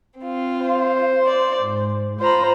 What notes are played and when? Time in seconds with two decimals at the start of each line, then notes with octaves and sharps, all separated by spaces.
0.19 C4 F4
0.64 C5
1.25 D5
1.60 G#2
2.20 F4 C5 A#5 B5